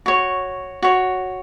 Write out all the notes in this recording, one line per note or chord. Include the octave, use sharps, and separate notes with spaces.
F#4 C#5
F#4 C#5